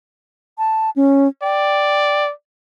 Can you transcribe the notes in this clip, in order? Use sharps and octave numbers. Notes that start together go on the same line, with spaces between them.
A5
C#4
D5 G5